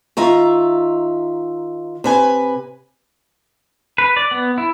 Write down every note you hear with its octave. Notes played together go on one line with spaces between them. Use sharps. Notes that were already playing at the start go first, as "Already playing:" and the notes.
D#3 F4 E5 A#5
C3 B4 G#5
B4
D5
B3
E4